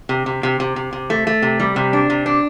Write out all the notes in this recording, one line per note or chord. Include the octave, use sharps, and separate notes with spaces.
C3
C3
C3
C3
C3
C3
A3
A3
C3
G3
C3
D4
C3
D4